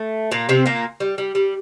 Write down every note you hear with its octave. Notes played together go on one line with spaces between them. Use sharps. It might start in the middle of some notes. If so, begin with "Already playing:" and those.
Already playing: A3
A#2 A#3
C3 C4
A#2 A#3
G3
G3
G3